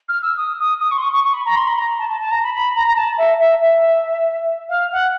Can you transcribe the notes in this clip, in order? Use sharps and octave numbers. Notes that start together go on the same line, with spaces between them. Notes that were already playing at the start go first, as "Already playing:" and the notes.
F6
E6
D#6
D#6
D#6
C#6
C6
C#6
C#6
C#6
B5
A#5
C6
B5
A#5
A5
A5
A5
A#5
B5
B5
A#5
A#5
A5
E5
E5
E5
F5
F#5